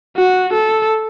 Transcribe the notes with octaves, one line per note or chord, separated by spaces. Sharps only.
F#4
A4